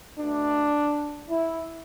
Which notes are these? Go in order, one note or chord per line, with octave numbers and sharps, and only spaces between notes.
B2 A3 D4
E4